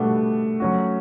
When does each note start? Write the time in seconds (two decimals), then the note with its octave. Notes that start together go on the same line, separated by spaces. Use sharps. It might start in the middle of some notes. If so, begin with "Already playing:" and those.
Already playing: B2 G3 A3 B3 D4 F#4
0.60 F#3 C#4 F#4